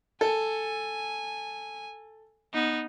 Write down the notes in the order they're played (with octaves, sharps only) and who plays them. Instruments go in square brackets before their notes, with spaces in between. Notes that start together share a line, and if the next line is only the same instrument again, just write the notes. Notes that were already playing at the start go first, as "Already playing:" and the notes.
[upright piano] A4 [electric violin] G#5
[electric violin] B3 D#4